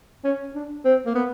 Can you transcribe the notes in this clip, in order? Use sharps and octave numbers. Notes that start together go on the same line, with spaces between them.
C#4
D4
C4
A#3
B3